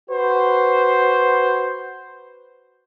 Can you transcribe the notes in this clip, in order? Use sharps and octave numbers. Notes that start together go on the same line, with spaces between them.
F#4 B4 C5